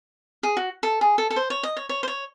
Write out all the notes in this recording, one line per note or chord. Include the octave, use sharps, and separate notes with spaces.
G#4
F#4
A4
G#4
A4
A4
C5
C#5
D#5
C#5
C#5
C5
C#5